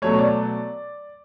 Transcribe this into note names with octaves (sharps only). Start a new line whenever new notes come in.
B2 F#3 A3 C#5
D5